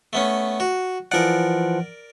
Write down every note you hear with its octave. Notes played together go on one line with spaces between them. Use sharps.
A3 B3 C#4
F#4
E3 F3 A#4 D5 F#5